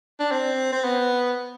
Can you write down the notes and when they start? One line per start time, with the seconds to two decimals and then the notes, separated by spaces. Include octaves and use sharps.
0.20 D4
0.31 C4
0.72 C4
0.84 B3